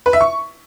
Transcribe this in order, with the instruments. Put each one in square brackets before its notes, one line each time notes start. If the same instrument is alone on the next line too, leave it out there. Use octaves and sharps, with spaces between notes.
[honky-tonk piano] B4
E5
C#6